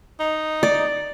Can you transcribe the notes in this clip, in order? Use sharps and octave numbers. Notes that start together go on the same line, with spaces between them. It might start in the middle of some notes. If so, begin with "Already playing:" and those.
D#4
D5